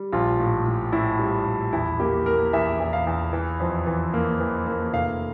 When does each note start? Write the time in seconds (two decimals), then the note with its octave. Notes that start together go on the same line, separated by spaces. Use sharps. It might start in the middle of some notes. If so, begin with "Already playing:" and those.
Already playing: G3
0.12 A#1 F4
0.39 A2
0.66 A2
0.92 A2 E4
1.19 G3
1.46 A#1
1.73 E2 E4
2.00 A#3 G4
2.26 A#3 A#4
2.53 E2 E5
2.80 E2
2.93 F5
3.07 E2
3.33 E3
3.60 F2
3.87 E3
4.14 A#3
4.40 E3
4.67 A#3
4.93 F1 F5